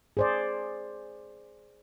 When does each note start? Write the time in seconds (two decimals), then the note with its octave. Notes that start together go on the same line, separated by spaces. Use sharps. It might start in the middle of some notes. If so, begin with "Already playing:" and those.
0.17 G#4 C5 D5